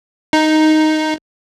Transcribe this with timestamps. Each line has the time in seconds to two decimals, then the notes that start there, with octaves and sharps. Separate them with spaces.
0.33 D#4